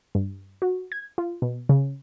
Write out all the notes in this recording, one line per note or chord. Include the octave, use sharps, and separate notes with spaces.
G2
F#4
G#6
F4
B2
C#3